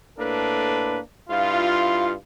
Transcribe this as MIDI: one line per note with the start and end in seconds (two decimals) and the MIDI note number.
0.18 0.98 45
0.18 0.98 58
0.18 0.98 62
0.18 0.98 69
0.18 0.98 71
1.29 2.13 43
1.29 2.13 64
1.29 2.13 65